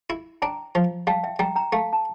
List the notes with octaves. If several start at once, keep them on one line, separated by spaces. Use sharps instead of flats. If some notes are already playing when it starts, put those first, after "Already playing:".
E4
D4 G5 A#5
F3
G3 F5 A5
E5 G5
G3 G5 A#5
G5 A#5
A3 F5 A5
A5